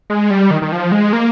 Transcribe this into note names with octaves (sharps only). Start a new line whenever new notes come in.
G#3
G3
D#3
D#3
F3
G#3
A#3